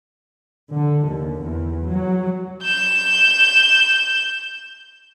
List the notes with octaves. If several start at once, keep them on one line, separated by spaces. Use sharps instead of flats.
D3
D#2
E2
F#3
G6 E7